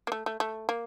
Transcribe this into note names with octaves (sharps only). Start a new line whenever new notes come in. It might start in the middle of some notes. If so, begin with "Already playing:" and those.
A#3
A3
A3
A3
A#3